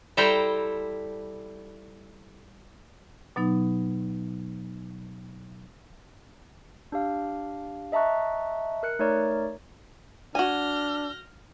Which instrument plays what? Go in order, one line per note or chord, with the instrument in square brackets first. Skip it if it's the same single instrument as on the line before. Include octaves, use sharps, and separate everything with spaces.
[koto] G3 E4 A4 C5 G5 A#5
[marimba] B2 F#3 B3 D#4
[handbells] D4 G4 F5
D#5 E5 A5 A#5 C#6 F#6
A#4 F#6 C#7
A3 D#4 A#4 C#5 D5 A#5
[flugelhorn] D4 [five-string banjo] F#4 G#5 [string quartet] F6 G6 A#6